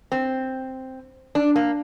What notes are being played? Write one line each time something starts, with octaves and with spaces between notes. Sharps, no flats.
C4
D4
A#3